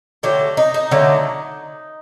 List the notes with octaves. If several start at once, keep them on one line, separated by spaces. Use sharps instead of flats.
D3 F#3 A3 G4
D#4
D#4
D3 F#3 A3